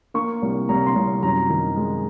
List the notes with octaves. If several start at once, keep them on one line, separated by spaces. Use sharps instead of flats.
A#3 C#6
C2
C2 A#5
C6
C2
F#2 A#5
D#3
G#3